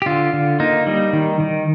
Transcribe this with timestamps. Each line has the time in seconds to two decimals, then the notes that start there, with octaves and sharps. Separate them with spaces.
0.02 G4
0.06 D3 F4
0.33 D3
0.60 A#3 D#4
0.87 G3
1.13 D#3
1.40 D#3